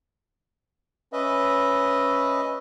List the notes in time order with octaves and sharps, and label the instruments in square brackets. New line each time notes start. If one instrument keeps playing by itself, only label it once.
[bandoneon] C#4 B4 D#5 E5